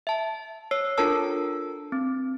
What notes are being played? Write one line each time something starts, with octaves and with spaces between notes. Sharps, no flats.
E5 A5
C#5 E6 C7
D4 F4 A4 A#4 A5 E6
C4